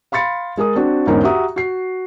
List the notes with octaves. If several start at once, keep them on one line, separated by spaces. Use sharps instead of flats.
F5 B5 C6 A6 C#7
G#3 G#4 A#4 D#6
C4 D4 F#4
E2 G#2 D3 C#4 D#4 A#4
F#4 G4 E5 F#5 A#5 D#6
F#4 C7